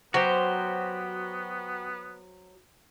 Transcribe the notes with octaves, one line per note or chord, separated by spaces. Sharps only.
F#3 B3 F#4 G4 C5